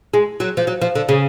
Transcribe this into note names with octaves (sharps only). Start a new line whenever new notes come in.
G#3
F#3
F3
F#3
F3
D3
C#3